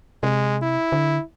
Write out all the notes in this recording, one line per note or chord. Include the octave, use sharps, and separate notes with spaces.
C3 G#3
E4
D3